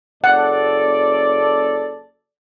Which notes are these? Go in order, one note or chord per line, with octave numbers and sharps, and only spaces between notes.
F#1 A4 D5 F#5